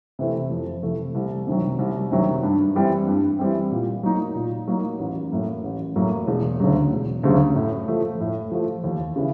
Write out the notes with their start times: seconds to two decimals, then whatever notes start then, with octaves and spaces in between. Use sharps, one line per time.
0.19 C3 E3 A3
0.51 F2
0.83 C3 E3 A3
1.15 C2
1.47 C3 D#3 F#3
1.79 C2
2.11 C3 D#3 F#3
2.43 G2
2.75 E3 G3 C4
3.07 G2
3.39 E3 G3 C4
3.71 A#2
4.03 F#3 A#3 D#4
4.35 A#2
4.67 F#3 A#3 D#4
4.99 A1
5.31 A2 F#3 A#3
5.64 A1
5.96 A2 F#3 A#3
6.27 E1
6.60 D2 C#3 F#3
6.92 E1
7.24 D2 C#3 F#3
7.56 A2
7.88 F3 A3
8.20 A2
8.52 F3 A3
8.84 D#2
9.16 C#3 E3